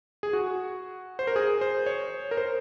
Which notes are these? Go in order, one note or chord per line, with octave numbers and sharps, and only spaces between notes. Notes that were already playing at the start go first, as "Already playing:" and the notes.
G#4
F#4
C5
A#4
G#4
C5
C#5
A#4
C5